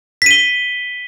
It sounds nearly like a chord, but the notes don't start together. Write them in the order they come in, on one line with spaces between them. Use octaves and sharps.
B6 D#7 G7